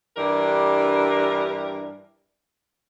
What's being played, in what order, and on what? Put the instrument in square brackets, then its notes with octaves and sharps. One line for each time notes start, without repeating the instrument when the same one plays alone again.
[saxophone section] G2 E3 D4 G4 A#4